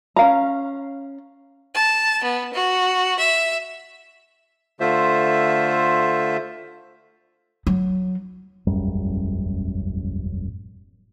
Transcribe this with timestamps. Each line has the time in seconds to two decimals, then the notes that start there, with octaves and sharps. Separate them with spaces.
0.16 C#4 F5 A#5
1.75 A5
2.23 B3
2.52 F#4
3.18 E5
4.80 D3 A3 F4 C5 E5
7.67 F#3
8.67 E1 A1 F#2 G3